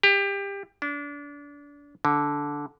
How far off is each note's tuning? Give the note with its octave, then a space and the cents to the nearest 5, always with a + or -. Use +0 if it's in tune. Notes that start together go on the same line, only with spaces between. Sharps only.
G4 +25
D4 -30
D3 -10